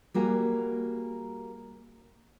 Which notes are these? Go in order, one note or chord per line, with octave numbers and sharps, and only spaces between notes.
G3 A#3 F#4 G#4